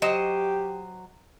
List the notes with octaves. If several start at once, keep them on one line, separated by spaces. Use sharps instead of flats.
F#3 G4 C5 D#5